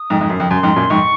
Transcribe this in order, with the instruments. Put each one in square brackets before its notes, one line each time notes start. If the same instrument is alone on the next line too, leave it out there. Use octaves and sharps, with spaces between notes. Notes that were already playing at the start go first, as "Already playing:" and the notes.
Already playing: [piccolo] D#6
[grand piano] F2 G#2
F2 G#2
F#2
F2
[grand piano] F#2 [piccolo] C6
[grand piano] F2 G#2
F#2 A#2
[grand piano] F2 G#2 [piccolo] C#6